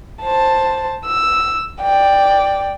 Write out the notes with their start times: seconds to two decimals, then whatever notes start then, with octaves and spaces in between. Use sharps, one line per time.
0.23 C5 A5
1.06 E6
1.82 D5 G5